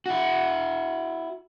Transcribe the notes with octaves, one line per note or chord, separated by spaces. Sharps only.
E4 F#4